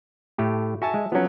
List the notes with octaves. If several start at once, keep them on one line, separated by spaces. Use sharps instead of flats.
A2 A3 G4
F#4 E5 G#5 A5
G#3
F3 F#3 B3 C#4